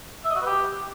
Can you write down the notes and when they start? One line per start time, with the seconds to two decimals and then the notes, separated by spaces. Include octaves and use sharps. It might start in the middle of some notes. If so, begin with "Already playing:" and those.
0.24 E5
0.30 D#5
0.35 F#4
0.41 B4
0.46 G4